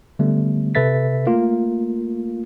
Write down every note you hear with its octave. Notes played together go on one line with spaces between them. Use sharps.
D3 G3 A3 B3
C3 A4 B4 E5 A6 B6
A3 A#3 F4